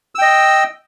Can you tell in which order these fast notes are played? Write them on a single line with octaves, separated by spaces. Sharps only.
E6 G5 D#5